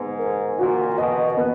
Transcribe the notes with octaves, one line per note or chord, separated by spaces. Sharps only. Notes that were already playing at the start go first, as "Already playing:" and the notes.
Already playing: G#2 B3
A#4
A#2 F#4
B2 D#5
B3